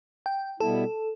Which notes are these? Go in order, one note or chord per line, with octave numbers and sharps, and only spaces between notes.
G5
B2 G3 B3 E4 A4